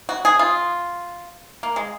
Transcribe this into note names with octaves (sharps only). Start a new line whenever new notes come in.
F#4
G#4
F4
A#3
G#3